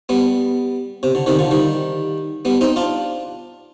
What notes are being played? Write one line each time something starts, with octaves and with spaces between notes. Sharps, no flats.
G3 B3
C3
D3
C3 D#3
D3 F3
D#3 G3
G3 B3
C4 D#4
D4 F4